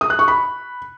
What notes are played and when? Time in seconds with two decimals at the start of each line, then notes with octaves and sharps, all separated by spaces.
0.01 D#6
0.10 F#6
0.19 C#6
0.28 B5